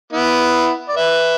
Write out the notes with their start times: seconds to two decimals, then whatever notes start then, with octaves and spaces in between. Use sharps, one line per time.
0.12 B3 E4
0.89 D5
0.96 B4 E5